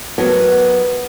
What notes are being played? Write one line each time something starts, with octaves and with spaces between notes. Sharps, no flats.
F#3 B3 F#4 A#4 C#5